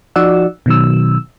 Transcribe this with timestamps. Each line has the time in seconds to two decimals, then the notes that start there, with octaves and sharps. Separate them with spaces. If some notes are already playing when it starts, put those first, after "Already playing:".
0.16 F3 D#4 F#4 D5 F#5 E6
0.66 B2 D#3 F#3 E6